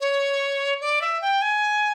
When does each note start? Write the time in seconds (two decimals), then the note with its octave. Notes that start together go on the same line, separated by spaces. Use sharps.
0.01 C#5
0.81 D5
1.01 E5
1.22 G5
1.42 G#5